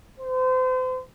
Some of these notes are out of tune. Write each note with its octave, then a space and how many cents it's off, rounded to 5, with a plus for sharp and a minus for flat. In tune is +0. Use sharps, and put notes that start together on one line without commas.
C5 -35